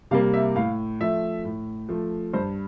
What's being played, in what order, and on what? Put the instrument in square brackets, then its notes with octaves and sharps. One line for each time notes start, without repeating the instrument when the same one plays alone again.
[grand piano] C3 G3 A#3 F5
E5
A2 F5
F3 A3 E5
A2
F3 A3
G2 C5